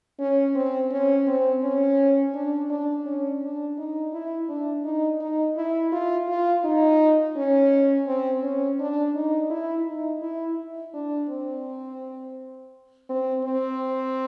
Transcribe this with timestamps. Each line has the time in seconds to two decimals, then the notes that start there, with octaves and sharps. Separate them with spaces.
0.20 C#4
0.55 C4
0.91 C#4
1.27 C4
1.63 C#4
2.34 D4
2.70 D4
3.06 C#4
3.42 D4
3.78 D#4
4.13 E4
4.49 D4
4.85 D#4
5.21 D#4
5.57 E4
5.92 F4
6.29 F4
6.64 D#4
7.36 C#4
8.07 C4
8.43 C#4
8.80 D4
9.15 D#4
9.50 E4
9.87 D#4
10.22 E4
10.94 D4
11.29 C4
13.09 C4
13.45 C4